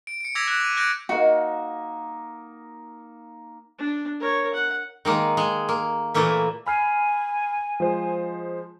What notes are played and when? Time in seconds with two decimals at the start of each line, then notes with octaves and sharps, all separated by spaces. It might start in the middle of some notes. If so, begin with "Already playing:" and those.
0.07 D7
0.21 C#7 D7
0.35 D6 E6 G#6 A#6 B6 F7
0.48 F#6
0.60 D6 D#7
0.76 D6 F#6 G6 A#6 D7
1.09 A#3 D#4 F#4
3.78 D4
4.20 A#4 C#5
4.54 F#5
5.05 D#3 G#3 A#3
5.37 G#3
5.69 A#3
6.14 A#2 E3 A3 A#3 E5
6.66 G#5 B5 F6 C7
7.80 F3 G#3 C5